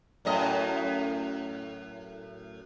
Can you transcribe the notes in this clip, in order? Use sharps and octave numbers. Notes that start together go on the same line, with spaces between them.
F#2 A2 D#5